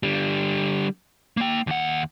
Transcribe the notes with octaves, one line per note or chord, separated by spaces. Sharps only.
D3 G3
A#3 G5
D#2 F#5